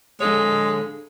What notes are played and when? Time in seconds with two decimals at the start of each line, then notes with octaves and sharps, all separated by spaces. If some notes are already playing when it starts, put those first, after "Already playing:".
0.20 G#3 D4 A4 C#5